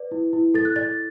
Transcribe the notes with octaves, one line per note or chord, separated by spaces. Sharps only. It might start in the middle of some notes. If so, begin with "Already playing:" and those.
Already playing: B4 D5
E4
E4
A4 A6
F#6
D5 A6